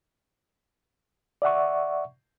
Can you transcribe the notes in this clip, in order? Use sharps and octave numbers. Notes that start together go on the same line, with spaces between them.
D5 E5 F#5 C#6